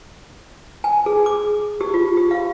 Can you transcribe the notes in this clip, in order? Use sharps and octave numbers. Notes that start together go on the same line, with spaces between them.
G#5
G#4
D6
G4
F4
G4
F5